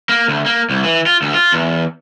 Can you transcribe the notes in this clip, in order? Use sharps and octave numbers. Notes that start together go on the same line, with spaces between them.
A#3
D2
A#3
C2
E3
F4
D2
F4
E2